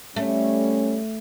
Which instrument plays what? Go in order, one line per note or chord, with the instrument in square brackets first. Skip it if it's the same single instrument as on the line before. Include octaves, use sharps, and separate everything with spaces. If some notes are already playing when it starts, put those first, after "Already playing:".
[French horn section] G3 C#4 [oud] A3